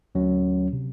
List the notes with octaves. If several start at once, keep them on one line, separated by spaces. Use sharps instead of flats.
D2 F#3 C#4
C3